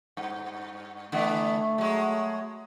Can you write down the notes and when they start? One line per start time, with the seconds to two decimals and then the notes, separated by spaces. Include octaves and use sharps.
0.17 G2
1.12 D3 E3 A3 B3
1.78 F#3 G#3